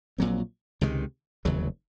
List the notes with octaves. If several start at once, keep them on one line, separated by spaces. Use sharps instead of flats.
A#1 A#2 F#3 C4
C#2 C3 D#3 G#3
F1 D#2 C#3 F#3